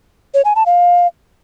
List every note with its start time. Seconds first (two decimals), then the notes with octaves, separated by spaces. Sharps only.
0.34 C#5
0.45 G#5
0.55 A5
0.66 F5